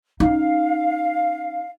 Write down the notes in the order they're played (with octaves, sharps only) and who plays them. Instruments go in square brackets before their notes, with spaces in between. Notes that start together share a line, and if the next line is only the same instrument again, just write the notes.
[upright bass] C#4 D#4 [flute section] F5